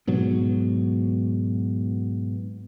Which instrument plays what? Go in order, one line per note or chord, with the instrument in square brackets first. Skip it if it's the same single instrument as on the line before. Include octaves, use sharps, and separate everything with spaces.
[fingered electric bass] G#2 B2 F#3